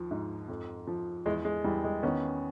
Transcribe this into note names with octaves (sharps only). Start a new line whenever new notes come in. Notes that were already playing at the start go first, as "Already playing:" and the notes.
Already playing: D#2 F3
G#2
F2
F3
E2 G#3
G#3
E2 G3
G#3
D#3 B3 C#4